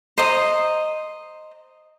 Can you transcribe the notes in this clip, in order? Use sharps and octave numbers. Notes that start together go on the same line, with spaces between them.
C5 D#5 A#5 D#6